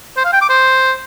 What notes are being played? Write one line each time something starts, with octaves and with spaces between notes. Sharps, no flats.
C5
F5
G5
D6
C5